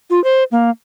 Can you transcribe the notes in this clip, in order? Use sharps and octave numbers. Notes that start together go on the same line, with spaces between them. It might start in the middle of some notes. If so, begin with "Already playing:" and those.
F4
C5
A#3